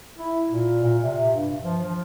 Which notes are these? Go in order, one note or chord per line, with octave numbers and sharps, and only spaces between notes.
E4
A#2
A#2
C3
G2
F3
F3